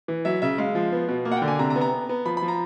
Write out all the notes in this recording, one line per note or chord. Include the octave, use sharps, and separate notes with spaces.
E3
F#3 E5
C#3 E5
G#3 F5
F3
B3
B2
A#3
F#5
G5
D3
G#5
C3 A#5
A#5
B3
A#5
B3
B3
F3 B5
B5
F3
A#5